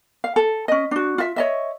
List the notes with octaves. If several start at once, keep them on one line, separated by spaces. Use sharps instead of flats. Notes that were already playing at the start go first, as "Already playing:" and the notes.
F5
A4
C#4 D#5
D4 F#4
F4 E5
C#5 D#5 E5